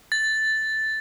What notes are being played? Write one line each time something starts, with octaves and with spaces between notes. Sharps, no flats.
A6